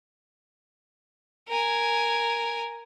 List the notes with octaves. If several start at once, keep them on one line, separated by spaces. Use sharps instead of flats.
A#4 G#5